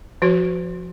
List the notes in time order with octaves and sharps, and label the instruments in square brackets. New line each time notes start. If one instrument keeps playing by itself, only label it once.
[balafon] F3 F#4 C#5